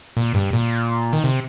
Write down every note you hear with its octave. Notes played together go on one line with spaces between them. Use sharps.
A#2
G2
A#2
D#3
C3